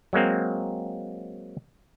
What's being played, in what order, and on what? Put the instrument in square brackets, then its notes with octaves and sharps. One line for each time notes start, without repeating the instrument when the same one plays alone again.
[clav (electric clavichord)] F#3 G#3 A#3 C4